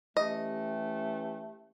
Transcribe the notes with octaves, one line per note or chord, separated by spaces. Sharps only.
E3 A3 C#4 G4 D#5